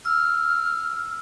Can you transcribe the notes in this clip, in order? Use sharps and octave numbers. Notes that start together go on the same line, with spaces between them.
E6 F6